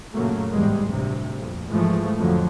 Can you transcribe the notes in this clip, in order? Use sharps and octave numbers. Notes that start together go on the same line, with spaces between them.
F#2 A#2 C#3 F#3 A3 A#3
A1 E2 G#2 G3 G#3
A1 D2 G2 C3
A#1 F2
G#2 E3 F3 G#3 A3
F2 A2 D3 F3 F#3